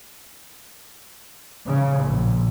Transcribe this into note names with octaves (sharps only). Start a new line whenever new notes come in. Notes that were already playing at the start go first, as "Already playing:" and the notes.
C#3
A#1